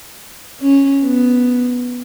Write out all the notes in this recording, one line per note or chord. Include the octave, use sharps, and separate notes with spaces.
C#4
B3